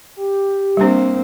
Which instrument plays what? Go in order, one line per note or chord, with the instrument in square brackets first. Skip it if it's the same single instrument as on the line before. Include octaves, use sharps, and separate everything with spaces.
[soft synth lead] G4
[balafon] G3 D4 [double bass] A#3 C4